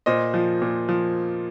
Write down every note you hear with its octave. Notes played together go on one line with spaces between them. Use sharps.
A#2 C5 D#5
F3
A#2
F3